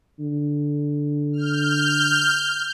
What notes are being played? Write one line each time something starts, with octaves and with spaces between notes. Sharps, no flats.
D3
F6 G6